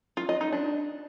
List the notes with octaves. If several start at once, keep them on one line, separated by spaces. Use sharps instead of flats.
F4
D#5
D#4
D4